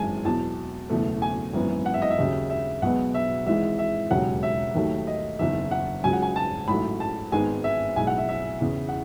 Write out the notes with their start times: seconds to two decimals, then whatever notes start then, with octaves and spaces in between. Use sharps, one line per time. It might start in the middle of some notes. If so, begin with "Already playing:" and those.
Already playing: G#1 F#2 E3 G#3 G#5 A5
0.25 E2 B2 F#3 A5
0.90 F#1 E2 B2 A3
1.22 G#5
1.53 G#1 F#2 E3 B3
1.86 F#5
1.94 E5
2.02 D#5
2.10 E5
2.18 D#2 C#3 F#3
2.50 E5
2.82 B1 B2 G#3 B3 F#5
3.14 E5
3.47 G#1 G#2 E3 G#3 E5
3.79 E5
4.11 E1 D#2 C#3 F#3 F#5
4.43 E5
4.75 D#2 D#3 F#3 A3
5.07 D#5
5.39 F#1 E2 D#3 E5
5.71 F#5
6.04 C#2 C#3 F#3 G#5
6.13 F#5
6.22 G#5
6.36 A5
6.68 A1 G#2 F#3 A3 B5
7.00 A5
7.32 G#1 G#2 D#3 G#3 B3 G#5
7.64 E5
7.96 B1 A2 G#3 G#5
8.07 F#5
8.18 E5
8.29 E5
8.61 E2 C#3 E3
8.89 F#5